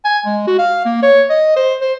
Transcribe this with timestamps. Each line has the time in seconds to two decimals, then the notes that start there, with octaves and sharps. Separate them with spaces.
0.05 G#5
0.25 G#3
0.47 F#4
0.59 F5
0.85 A#3
1.03 C#5
1.30 D#5
1.56 C5
1.81 C5